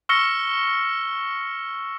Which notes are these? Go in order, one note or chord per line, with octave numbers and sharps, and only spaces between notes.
C#6 E6 F6 A#6 C#7 G7